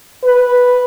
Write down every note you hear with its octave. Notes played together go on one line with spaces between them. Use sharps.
B4